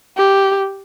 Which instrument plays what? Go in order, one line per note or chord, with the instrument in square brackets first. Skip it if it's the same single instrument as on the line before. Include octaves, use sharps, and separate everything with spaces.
[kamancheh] G4